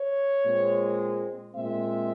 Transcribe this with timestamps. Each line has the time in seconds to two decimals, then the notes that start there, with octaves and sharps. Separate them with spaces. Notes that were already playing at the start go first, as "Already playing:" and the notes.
Already playing: C#5
0.45 A#2 G#3 C4
1.54 A#2 G#3 C4 E5